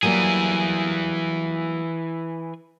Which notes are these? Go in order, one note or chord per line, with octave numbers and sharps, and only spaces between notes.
E3 F#3 G3 A#3 G#4